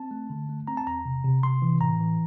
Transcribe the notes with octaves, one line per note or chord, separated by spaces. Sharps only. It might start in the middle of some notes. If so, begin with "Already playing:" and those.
Already playing: C4 A5
A3
D3
A3
C4 A#5
A5
E2 A#5
C3
C3
C3 C6
E3
A2 A#5
E3